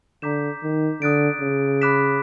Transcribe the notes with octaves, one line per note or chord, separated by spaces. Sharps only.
D3 A#5 D6 G6 B6 E7
D#3
D3 D#6 F#6 A6 D7
C#3
B5 D6 F#6 B6 E7